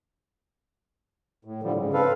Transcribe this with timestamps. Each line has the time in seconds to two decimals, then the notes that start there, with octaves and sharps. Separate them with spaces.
1.45 A2
1.63 D3 F3 G3
1.75 G#2 C#3
1.93 C4 A4 B4 F5